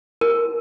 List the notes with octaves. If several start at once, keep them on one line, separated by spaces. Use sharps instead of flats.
A#4